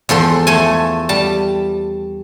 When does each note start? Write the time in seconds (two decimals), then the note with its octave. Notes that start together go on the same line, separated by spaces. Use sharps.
0.09 E2 F3 A4 C6
0.47 A3 A4 G#5
1.09 G3 A5